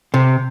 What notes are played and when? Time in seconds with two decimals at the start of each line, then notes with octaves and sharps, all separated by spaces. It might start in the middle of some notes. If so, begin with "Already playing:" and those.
0.14 C3